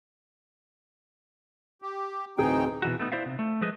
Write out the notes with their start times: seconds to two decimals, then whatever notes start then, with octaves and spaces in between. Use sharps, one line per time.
1.82 G4
2.38 D1 E3 C4 D#4 G#4 G5
2.82 B2 E3 F#4
3.00 A3 B3 D#4
3.12 E4 C5 D5 E5 F5
3.26 C3
3.39 A3
3.61 F3 G#3 A3 G#4 B4 D#5